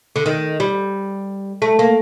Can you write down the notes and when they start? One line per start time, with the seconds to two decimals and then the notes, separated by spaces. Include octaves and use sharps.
0.16 D3
0.26 D#3
0.60 G3
1.62 A3
1.79 A#3